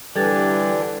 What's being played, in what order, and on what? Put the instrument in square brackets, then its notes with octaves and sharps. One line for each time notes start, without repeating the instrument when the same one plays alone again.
[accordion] D3 E3 [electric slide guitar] G3 [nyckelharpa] D4 [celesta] A4 G#6 A6